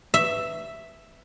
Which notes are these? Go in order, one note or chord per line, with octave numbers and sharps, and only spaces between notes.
E5